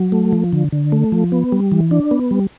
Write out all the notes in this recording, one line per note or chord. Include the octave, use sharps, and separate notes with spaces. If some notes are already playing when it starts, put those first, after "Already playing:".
Already playing: F#3
A3
F3
D3
D3
A3
F3
B3
G3
E3
D4
B3
G3